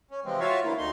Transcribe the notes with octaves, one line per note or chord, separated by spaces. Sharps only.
C#4
C3 E3 F3 G#3 C4
F4 F#4 C#5 E5 F5
D3 E3 A#3 E4
D2 D#4 C6